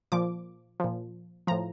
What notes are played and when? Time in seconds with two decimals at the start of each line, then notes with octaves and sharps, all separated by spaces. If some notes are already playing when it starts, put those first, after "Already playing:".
0.12 A#2 F3 D6
0.80 A#2 F3
1.47 A2 F3 A#5